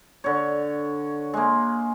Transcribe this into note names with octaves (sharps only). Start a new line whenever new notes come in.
D3 C#5
G#3 A#3